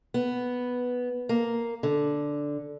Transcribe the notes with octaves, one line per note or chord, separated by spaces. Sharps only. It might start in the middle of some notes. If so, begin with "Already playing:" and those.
B3
A#3
D3